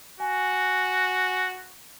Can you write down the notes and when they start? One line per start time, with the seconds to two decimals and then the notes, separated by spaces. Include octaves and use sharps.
0.20 F#4 G#5